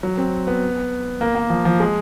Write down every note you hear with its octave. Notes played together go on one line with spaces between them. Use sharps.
F#3
C4
B3
A#3
A#3
F3
F3
G#3